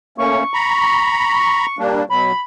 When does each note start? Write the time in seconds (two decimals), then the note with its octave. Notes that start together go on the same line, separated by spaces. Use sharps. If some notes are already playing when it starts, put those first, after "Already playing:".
0.18 A3 A#3 C#4 C#6
0.54 A#5 B5
1.79 G3 A#3 D4
2.10 B2 F#3 B5